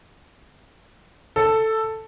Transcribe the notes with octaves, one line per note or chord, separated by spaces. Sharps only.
A4